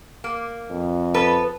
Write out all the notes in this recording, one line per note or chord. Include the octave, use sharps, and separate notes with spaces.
A#3
F2
B3 A4 B4